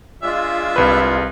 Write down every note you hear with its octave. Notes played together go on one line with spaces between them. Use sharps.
G#3 D4 F4 G#4 E5
C2 B4